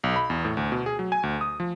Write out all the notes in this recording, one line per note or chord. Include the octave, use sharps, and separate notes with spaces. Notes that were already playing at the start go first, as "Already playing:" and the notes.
B1
B5
E2
A2
D2
B2
G#4
F#3
G#5
D2
D#6
F3